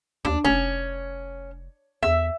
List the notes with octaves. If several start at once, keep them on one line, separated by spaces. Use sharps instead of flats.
D#2 D4
F1 C#4
E2 E5